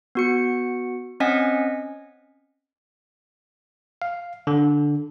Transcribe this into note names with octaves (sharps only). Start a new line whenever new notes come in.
B3 F#4 C#7
C4 C#4 D#5 F#5 G#5 B6
F5
D3